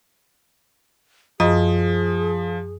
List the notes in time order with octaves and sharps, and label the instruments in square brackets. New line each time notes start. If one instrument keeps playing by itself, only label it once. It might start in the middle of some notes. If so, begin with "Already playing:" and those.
[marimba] F#2 D#5 D#6 [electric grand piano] F3 [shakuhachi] G#4